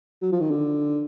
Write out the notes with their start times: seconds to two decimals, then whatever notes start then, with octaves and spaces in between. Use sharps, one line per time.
0.22 F#3
0.32 F3
0.40 D#3
0.51 D3